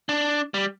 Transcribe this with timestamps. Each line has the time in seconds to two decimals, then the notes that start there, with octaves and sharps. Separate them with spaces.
0.09 D4
0.54 G3